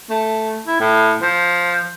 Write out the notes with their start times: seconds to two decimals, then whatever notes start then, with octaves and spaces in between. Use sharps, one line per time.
0.10 A3
0.67 E4
0.80 A2
1.22 F3